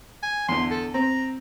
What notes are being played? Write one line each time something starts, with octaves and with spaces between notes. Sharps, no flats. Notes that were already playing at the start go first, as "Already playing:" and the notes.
G#5
E2 D3 C6
A4
C4 A#5